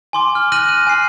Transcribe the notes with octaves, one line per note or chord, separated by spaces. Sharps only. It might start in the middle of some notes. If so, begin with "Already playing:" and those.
G#5 C6 D6
F6
F6 F#6 A#6 D#7 F#7
F#6
G#5 C7